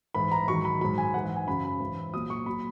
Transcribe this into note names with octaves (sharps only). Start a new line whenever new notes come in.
G#2 E3 B5
A#5
G#2 D#3 F#3 C#6
B5
G#2 F#3 B5
G#5
G#2 E3 F#5
F#5
G#5
F#2 C#3 F#3 B5
B5
G#2 E3
A#2 F#3 D#6
C#6
A#2 F#3 B5